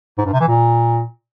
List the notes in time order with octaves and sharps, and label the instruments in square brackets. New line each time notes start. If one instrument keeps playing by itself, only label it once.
[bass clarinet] G#2
G2
C3
E3
A#2